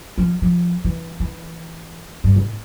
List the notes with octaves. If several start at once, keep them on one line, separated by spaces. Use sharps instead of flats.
F3
F3
E3
E3
G2
A2